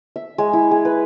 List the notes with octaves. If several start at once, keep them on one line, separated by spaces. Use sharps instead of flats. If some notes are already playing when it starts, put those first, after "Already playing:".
E5
G#3
E4
G#4
B4